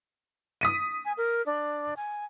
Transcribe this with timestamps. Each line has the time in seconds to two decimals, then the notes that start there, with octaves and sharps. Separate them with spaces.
0.61 D#6 B6 D#7
1.05 G#5
1.18 A#4
1.46 D4
1.97 G#5